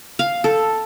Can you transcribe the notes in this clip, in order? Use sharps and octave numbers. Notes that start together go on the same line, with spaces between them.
F5
A4